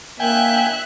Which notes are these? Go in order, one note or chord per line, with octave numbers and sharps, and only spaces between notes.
A#3 E5 G5 G#5 F#6